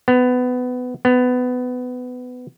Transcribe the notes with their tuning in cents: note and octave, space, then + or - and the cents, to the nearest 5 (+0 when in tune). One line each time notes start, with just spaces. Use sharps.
B3 +20
B3 +20